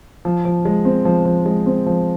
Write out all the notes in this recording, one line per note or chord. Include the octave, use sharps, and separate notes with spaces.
F3
F3
G#3
C4
F3
F3
G#3
C4
F3